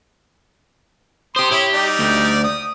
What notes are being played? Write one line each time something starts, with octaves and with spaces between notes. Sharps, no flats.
G4 C5 C6 D#6
E4 G4 C#5
G3 D#4 D5
D2
D#6